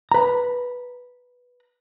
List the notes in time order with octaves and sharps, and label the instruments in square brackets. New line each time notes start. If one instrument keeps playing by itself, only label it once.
[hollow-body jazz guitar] B4 A#5